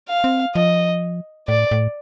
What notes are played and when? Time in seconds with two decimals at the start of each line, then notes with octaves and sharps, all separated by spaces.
0.09 F5
0.24 C4
0.55 F3 D#5
1.48 A2 D5
1.71 A2